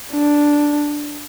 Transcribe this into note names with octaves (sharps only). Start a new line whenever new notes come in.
D4